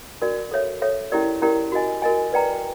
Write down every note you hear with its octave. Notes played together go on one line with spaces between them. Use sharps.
D4 F#4 A#4 D5
A4 C#5 E5
A4 C#5 E5
C#4 E4 G4 A#4 D5
C#4 E4 G4 A#4 D5
F#4 A#4 D#5 G#5
F#4 A#4 D#5 G#5
B4 D5 G5 A#5